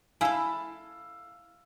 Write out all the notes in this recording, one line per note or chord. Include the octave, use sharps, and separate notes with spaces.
E4 G#4 A4 F5 E6